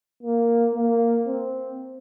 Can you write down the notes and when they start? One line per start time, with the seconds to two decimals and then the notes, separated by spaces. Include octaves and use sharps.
0.23 A#3
0.75 A#3
1.27 C4